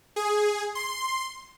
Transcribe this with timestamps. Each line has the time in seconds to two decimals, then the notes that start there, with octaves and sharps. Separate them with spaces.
0.16 G#4
0.75 C6